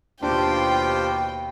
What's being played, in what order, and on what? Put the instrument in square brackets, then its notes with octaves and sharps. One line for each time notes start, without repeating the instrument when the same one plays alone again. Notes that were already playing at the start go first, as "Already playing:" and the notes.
[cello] D#2 B2 [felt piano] D4 [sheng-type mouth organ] F4 G4 C5 [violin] G5